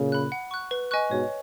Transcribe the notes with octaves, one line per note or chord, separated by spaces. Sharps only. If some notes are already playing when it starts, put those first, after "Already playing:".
Already playing: A#2 C#3
B5 F#6
F#5
C#6 F#6
B4
D#5 G#5 C#6 F#6
G#2 B2 C#5